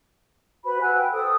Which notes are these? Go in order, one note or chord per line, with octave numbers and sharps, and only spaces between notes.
F#4 B4 C5 B5
F#5 G#5 E6 F#6
B4 G5
A4 C5 D#6 E6